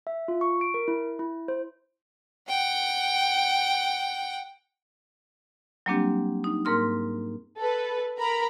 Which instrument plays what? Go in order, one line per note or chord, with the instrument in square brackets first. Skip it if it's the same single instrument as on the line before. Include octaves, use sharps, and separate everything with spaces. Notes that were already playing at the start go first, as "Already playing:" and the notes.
[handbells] E5
F4
C#6
D7
A#4
E4
E4
C5
[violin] F#5 G5
[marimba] F#3 G3 A#3 C4 D4 G4
D#4
G#2 A#3 A#4 C6 F6
[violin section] A4 B4
A#4 A#5 B5